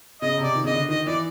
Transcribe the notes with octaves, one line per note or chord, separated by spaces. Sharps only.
C#3 D#5
C3
D5
D#3
C#3 D#5
D3
D#3 D#5
E3 D5